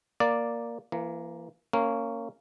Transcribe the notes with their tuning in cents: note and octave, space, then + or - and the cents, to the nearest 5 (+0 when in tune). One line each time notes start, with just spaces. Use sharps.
A#3 +0 D5 +0
E3 +35 A#3 +0
A#3 -20 C#4 +0